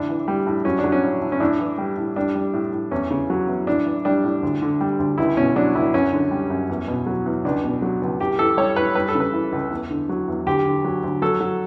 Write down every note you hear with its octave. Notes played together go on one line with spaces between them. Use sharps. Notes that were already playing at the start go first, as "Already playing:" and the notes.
Already playing: D2 A2 D4
E3
G3
A2
F#3 C#4
D4
F#3
C#4
A2
A2
C#4
A2 D4
E3
G3
A2
G3 D4
G3
A2
A2
E2 C#4
C#3
F#3
E2
A2 D4
E3
G3 D4
A2
D2
D3
G3
D2
C#2 E4
B2 C#4
F#3 D4
C#2 E4
F#2 C#4
D3
G3
F#2
E2
B2
F#3
E2
C#2 D4
B2
F#3
C#2
A2 G4
E3 A4
G3 C#5
A2 B4
G3 B4
A4
C#3
B4
E3
C#2
E2
D3
F#3
E2
D2 G4
D3
F#3
D2
F#3 A4
F#3